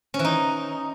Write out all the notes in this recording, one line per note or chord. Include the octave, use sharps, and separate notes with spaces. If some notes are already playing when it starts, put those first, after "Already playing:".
C#4
E3
D#4